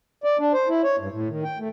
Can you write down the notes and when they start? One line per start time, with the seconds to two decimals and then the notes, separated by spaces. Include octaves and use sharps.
0.24 D5
0.39 D4
0.54 C5
0.69 E4
0.84 C#5
0.99 G2
1.12 A2
1.28 D#3
1.44 G5
1.59 A3